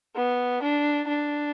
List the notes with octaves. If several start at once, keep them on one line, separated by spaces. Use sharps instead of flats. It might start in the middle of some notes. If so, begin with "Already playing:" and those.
B3
D4
D4